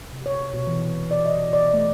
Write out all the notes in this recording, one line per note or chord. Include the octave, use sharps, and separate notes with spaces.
C3
C#5
B2
E3
D5
D#5
D5
A3